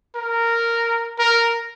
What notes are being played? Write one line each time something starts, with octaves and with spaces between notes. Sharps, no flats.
A#4
A#4